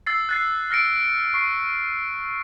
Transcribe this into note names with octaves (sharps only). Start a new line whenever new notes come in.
E6 A6 C7
F#6 A6 C7
F6 A#6 C#7 D7
C#6 C7